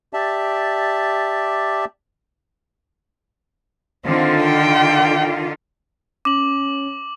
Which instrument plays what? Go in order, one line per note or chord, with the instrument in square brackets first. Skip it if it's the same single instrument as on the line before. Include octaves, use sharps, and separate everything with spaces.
[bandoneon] G4 D5 E5 A5
[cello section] D3 D#3 F4 [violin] C4
[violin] G5
[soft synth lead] C#4 [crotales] D6 F#7